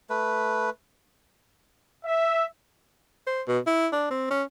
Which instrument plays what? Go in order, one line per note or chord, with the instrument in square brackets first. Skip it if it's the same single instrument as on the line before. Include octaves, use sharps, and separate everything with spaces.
[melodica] A3 B4
[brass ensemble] E5
[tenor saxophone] C5
B2
E4
D4
C4
C#4